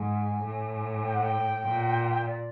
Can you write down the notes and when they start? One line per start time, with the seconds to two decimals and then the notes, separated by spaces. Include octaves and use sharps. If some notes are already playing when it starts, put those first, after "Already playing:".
Already playing: G#2 G#5
0.44 A2
1.05 G5
1.14 F#5
1.23 G5
1.65 A#2
2.26 D5